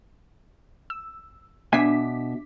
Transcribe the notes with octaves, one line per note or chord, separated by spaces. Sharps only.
E6
B2 D4 E5 G#5 D6 B6